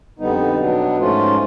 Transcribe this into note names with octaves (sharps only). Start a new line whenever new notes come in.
F2 D3 G3 B3 D#4
B2 F#3 B3 D4
G#2 F3 A3 C#4 F4